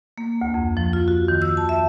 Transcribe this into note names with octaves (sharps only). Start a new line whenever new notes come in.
A#3
D2
F2
F3
F4
F#4
D#3
E6
A5
E5